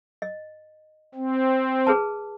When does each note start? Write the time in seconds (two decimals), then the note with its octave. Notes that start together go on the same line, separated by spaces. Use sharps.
0.22 D#5
1.15 C4
1.87 G#4 B4 A5